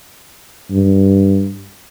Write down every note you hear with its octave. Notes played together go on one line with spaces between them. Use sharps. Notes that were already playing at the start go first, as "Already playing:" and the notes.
G2